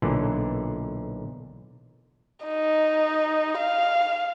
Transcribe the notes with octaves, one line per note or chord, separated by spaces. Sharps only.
B1 A#2 D3 E3
D#4
F5